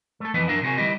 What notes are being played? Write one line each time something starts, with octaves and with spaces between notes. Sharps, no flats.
A3 A4
F2 E3 B3 B4 D#5 F#5
F#2 D4 A#4 E5 F#5
C3 A#3 F#4 G#4
D#3 G3 E4 G4 D#5